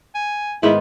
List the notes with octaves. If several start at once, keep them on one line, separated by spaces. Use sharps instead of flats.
G#5
G#2 D#3 B3 E4